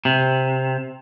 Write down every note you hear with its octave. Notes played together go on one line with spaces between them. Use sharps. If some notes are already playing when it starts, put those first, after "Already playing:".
C3